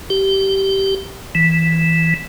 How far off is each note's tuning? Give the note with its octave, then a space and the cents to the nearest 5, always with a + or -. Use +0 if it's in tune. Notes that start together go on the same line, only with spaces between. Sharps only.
G4 -15
E3 -5